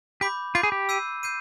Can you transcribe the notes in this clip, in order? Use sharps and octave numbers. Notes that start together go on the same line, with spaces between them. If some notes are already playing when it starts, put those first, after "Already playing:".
G4 B5 D6 G6
F4 B5 D6 G6
G#4
G4
E6 G6 C7 D#7
G6 C7 D#7